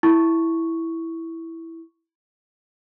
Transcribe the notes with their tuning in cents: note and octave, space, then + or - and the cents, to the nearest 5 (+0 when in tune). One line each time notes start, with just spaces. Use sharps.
E4 +0 C#6 +0